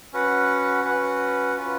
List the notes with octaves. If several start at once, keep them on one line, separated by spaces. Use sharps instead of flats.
C#4 F#4 B4 F#5
C#4 F#4 B4 F#5
C#4 F4 B4